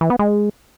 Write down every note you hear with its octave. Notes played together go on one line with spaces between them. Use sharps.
E3
B3
G#3